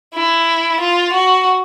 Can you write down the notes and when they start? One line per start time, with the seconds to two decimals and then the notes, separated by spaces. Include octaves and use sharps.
0.14 E4
0.80 F4
1.13 F#4